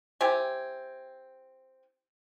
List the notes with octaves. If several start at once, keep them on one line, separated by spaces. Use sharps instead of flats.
C4 E4 G4 G#5